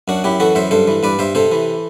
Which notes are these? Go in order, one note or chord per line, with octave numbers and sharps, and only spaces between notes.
F#2 D4 F#4
F#2 E4 G4
E3 F#4 A4
F#2 C5 E5
G2 A4 C5
E3
G2 B4 D5
G2 C5 E5
C3 A4 C5
E3